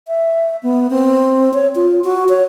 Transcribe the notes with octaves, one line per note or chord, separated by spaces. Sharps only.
E5
B3
C4
C#5
F4
F#4
C#5